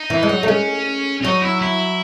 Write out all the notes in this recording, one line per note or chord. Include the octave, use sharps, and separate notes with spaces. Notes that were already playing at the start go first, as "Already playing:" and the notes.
Already playing: D#4
E3
G#3
F#3
A3
G#3 C#4
F#3 D#4
E4
E4